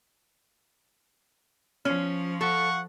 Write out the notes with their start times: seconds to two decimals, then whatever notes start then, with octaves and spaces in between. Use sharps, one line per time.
1.85 F3 C#4
2.41 A4 F5 F#5 C#6